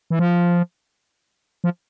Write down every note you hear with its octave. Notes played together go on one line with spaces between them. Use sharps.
E3
F3
F3